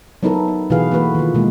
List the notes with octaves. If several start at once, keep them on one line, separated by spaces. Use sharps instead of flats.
F#3 B3 D#4 E4 A4 A#4
D#4
B2 E3 F#4 G#4 B4 F5
E3 A3 A#3 F#4 B4
D#3 F4
B2 G#3 A#3